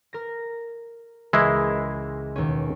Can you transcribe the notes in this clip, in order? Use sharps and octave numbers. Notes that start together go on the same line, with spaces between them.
A#4 A#6
C#2 E3 G#3 E4 A#4
D#2 B2 C#4